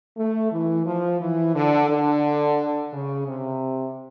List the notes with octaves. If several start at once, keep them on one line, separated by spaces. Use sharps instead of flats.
A3
E3
F3
E3
D3
D3
C#3
C3